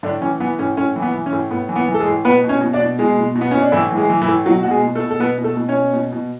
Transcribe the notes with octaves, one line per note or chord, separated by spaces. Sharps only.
A2 D3 D4
E3 C#4
E3 B3
A2 C#4
A2 C#4
E3
B3
E3
C#4
A2
A2 B3
E3
B3
E3
A4
G#3 G#4
A2
B2 B3 B4
B2
C#4 C#5
B2
D4 D5
B2
B2 G#3 G#4
B2
B2
B3
B2 C#4
D4
A2 E3 E4
E3
G#3 G#4
E3
E3 E4
A2
B2 F#3 F#4
B2 F#4
G#3 G#4
B2
A3 A4
B2
A4
B2 B3 B4
B2
A3 A4
B2
C#4 C#5
B2
B2
B2